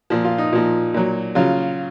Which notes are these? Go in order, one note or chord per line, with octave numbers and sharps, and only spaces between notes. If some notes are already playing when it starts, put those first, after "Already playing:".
A#2 F3
F4
D#4
A#2 F3
A#2 F#3
C#3 F#3 F4